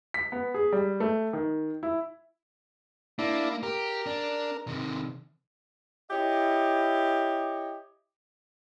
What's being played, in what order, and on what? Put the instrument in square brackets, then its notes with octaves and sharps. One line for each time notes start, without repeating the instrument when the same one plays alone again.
[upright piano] B6
B3
G#4
G3
A3
D#3
E4
[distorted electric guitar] A#3 [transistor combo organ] D4 E4
[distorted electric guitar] G4 [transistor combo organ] A#4
[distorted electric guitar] D4
C3 D#3
[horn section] E4 G4 C#5 D#5